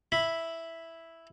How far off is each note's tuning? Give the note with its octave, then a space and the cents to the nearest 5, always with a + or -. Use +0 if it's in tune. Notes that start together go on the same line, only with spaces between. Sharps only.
E4 +0 B5 +0